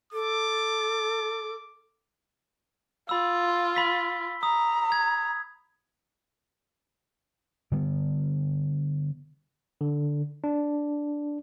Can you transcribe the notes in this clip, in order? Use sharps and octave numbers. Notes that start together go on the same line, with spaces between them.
A4 D6
F4 B5 E6
B5 B6 G7
A#5 D#6
G#6
D3 G3 B3
D3
D4